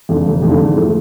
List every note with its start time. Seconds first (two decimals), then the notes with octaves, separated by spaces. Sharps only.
0.09 F2 D3
0.26 F1
0.42 F2 D3
0.60 G#2
0.76 F3 A3